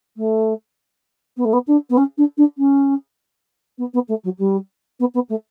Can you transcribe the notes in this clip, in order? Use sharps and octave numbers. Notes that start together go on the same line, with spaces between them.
A3
B3
A3
B3
D4
B3
C#4
D4
D4
C#4
B3
B3
A3
F#3
G3
B3
B3
A3